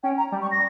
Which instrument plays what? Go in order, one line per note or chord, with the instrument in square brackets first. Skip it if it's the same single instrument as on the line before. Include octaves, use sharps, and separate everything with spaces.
[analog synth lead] C#4 [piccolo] G5
[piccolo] A#5
[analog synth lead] G3
[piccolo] C#6
A#6